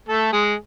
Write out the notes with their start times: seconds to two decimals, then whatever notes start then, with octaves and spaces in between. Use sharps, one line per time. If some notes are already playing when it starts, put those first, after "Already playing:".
0.09 A3 A4
0.32 G#3 G#4